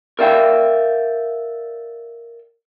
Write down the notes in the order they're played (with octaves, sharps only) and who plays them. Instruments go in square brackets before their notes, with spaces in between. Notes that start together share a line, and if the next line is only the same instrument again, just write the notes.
[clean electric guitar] A#4 D5 E5 F5 G5